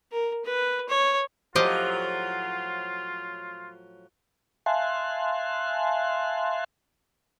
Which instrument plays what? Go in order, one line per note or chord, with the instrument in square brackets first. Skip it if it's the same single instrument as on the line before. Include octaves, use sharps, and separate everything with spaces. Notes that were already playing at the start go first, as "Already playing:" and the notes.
[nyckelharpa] A#4
B4
C#5
[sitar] A2 F3 F#3 [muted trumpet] F4 [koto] G4 D#5 F5 [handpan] C5
[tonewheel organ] E5 F5 G#5 A5 C6 F#6